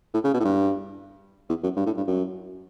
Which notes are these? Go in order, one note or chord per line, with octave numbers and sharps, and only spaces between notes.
A2
C#3
B2
A2
G2
E2
F#2
G2
A2
G2
F#2